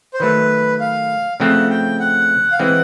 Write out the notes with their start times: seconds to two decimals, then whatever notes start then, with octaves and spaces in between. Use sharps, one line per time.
0.14 C5
0.20 D#3 F#3 A3 B4
0.80 F5
1.40 C#3 F3 A3 C4 F#5
1.70 G5
2.00 F#5
2.52 F5
2.59 E3 G#3 C4 F#5